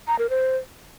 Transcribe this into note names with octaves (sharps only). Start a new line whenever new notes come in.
A#5
A#4
C5